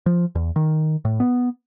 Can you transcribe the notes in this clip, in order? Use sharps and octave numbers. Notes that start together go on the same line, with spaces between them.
F3
E2
D#3
A2
B3